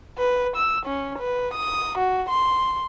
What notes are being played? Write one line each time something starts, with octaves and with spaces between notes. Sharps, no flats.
B4
E6
C#4
B4
D#6
F#4
C6